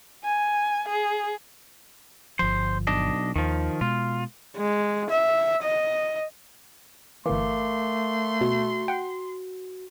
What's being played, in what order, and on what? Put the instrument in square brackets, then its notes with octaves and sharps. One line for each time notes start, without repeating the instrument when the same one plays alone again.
[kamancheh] G#5
G#4
[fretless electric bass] G1 F3 [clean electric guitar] C5
[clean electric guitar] B1 D4 D#5
[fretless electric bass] D#2 [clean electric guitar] D#3 F3
[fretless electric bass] B2 G#3 [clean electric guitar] F4
[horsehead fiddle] G#3
E5
D#5
[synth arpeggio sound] G1 E3 [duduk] A3 [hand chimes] A#4 F5 D6 [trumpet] C6
[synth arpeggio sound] B2 [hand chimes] F#4
[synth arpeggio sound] F#5 G5